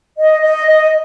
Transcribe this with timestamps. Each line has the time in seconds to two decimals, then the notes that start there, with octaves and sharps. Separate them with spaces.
0.18 D#5
0.42 D#5
0.66 D#5